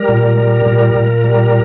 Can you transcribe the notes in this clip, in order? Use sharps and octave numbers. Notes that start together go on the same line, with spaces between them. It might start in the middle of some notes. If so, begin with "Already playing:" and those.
Already playing: G3 A#4
A#2
G3
A#2
A#2
G3